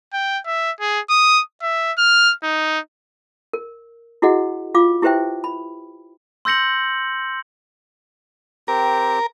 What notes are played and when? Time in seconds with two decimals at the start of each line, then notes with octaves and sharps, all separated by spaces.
0.13 G5
0.46 E5
0.80 G#4
1.10 D#6
1.62 E5
1.98 F6
2.43 D#4
3.53 A#4
4.22 E4 F#4 G#4 D#5 F#5
4.75 F4 F5 D6
5.02 E4 G4 B4 C5 E5 G5
5.44 B5
6.45 C6 E6 G6 A#6 C#7 F#7
8.68 C4 G4 A#4